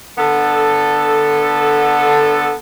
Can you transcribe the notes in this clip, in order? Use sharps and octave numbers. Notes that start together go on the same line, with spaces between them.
D3 B3 A4